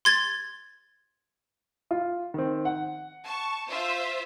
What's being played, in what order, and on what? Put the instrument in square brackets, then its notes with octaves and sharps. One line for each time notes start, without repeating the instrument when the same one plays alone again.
[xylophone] C6 G#6 A6
[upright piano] F4
D#3 C4
F#5
[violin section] A5 C#6
F4 C5 E5